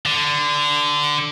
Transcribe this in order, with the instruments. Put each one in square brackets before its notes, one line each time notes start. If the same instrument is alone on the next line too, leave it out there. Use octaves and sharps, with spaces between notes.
[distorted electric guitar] D3